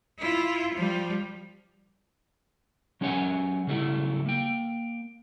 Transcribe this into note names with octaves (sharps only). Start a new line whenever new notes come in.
E4 F4
F3 G3
F#3 C#4 G4 C#5 F#5 G#5
C#3 F#3 G3 A3 E4
A#3 G5